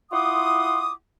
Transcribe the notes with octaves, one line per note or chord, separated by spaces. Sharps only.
E4 F4 F#5 C6 D6 D#6